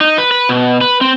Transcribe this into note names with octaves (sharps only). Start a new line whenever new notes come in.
D#4
B4
B4
B2
B4
C4